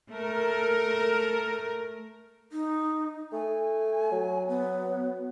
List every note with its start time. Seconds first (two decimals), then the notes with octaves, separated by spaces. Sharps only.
0.10 A3 A#4
2.50 D#4
3.32 A3 G#5
4.12 F#3
4.48 B3